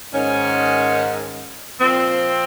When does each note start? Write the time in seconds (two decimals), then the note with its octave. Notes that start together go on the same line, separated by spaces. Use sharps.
0.12 G#2 D#3 C#4
1.80 A#2 F3 C4